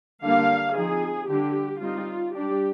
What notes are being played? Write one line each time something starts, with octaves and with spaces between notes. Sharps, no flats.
D3 G3 A#3 D4 F5
F3 C4 D#4 G#4
D3 G3 D4 G4
G3 C4 D#4 F4
G3 D4 G4